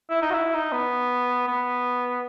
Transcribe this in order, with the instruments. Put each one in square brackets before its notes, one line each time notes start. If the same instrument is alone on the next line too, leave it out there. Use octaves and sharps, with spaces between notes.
[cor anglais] E4
D#4
F#4
E4
D#4
B3
B3